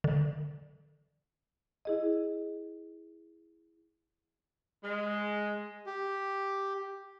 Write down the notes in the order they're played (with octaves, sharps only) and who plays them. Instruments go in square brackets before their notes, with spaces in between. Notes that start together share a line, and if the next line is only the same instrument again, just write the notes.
[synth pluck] D3
[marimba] E4 G#4 D#5
[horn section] G#3
[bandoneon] G4